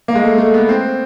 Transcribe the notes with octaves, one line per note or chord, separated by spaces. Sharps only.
A#3
G#3
A3
A3
B3
C4